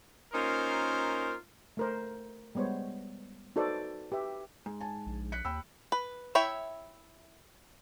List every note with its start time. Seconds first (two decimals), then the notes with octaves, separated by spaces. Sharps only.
0.33 A#3 C#4 D#4 F4 A#4 C5
1.77 A3 A#4 C5
2.55 G3 G#3 B3 C5 C#5
3.56 D#4 F#4 A4 B4 C5 D5
4.12 G4 B4 E5
4.66 G#2
4.81 G#5 A5
5.06 A#1
5.32 F#6 B6 C#7
5.45 D#2 G5 B5 E6
5.92 B4
6.35 E4 C#5 E5 G5